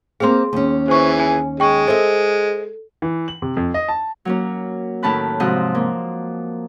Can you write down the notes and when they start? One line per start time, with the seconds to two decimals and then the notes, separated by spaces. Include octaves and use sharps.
0.20 A#3 C4 G#4 F5 C6
0.53 D#2 C#4
0.88 E3 G#4 C5 C#6
1.19 G#5
1.60 G#3 G5 C#6
1.88 A4 C5 D#5 E5
3.02 E3
3.28 F#7
3.42 C3
3.57 F2
3.74 D#5
3.88 A5
4.25 F#3 A#3 C#4
5.02 A2 D#3 C#4 A5 B5 F#6
5.40 G#2 C3 F3 F#4 D#5
5.75 A#3